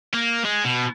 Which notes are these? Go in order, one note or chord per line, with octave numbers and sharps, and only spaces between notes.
A#3
G#3
B2